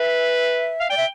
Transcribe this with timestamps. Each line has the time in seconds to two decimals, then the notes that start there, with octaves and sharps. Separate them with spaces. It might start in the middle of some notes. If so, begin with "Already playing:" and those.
Already playing: B4 E5
0.80 F5
0.90 D5 G5
0.97 E5